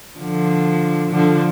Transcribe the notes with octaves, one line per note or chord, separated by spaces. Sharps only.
D3 F3
D3 F3